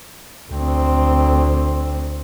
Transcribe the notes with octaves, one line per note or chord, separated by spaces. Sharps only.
D2 C4